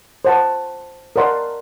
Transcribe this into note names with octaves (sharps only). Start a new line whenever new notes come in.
C5 F#5 A5
A#4 D5 F#5 C6